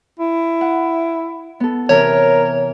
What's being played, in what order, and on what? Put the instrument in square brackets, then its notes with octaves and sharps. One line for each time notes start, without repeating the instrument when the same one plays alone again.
[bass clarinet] E4
[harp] F#5
B3 A4
[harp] C3 E3 [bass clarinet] A#4 [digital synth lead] C#5